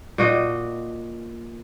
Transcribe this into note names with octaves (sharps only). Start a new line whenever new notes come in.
A#2 F#4 D#5